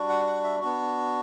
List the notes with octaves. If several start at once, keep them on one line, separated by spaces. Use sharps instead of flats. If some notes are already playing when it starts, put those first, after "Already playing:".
Already playing: G3 D4 F#4
F#5
F#5
E5
B3 D4 F#4